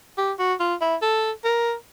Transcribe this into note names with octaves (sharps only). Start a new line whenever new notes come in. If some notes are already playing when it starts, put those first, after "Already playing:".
G4
F#4
F4
E4
A4
A#4